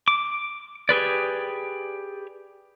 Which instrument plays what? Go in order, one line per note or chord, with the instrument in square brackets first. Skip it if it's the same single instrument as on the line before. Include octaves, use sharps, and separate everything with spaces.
[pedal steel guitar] D6
G4 G#4 B4 D5